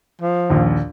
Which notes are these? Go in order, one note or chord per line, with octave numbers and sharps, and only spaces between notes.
F3
A#1 D#2